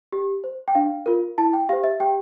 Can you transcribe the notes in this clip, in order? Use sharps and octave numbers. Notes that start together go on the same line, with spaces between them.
G4
C5
G5
D4 F5
F4 A#4
E4 A5
G5
G4 C5 F5
E5
G4 G5